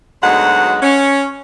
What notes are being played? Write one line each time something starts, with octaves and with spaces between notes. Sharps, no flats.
D2 F#3 G#3 B3 D#4 F#5
C#4